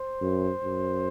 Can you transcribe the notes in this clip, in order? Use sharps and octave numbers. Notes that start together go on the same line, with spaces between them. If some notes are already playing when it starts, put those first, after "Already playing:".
Already playing: C5
F#2
F#2